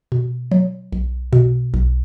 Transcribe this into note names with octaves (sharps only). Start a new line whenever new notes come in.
B2
F#3
B1
B2
B1